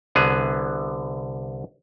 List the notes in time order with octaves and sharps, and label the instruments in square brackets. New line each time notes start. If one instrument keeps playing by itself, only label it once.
[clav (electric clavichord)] C2 D3 B3 G#4